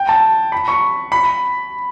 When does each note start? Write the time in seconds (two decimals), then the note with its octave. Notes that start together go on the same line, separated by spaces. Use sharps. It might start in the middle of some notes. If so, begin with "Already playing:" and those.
Already playing: G5
0.09 A5
0.52 B5
0.68 C#6
1.12 B5